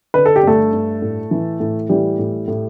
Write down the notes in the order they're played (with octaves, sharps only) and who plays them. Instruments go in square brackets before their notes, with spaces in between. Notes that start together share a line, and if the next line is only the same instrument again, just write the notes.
[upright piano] D3 B4
A4
G4
G2 A3 A4
G2
A2
E3
A2
E3 G3 G4
A2
A2